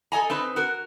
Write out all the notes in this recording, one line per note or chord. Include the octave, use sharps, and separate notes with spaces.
A4 D#5 G#5 A#5
C4 D#4 B4
F#4 A#4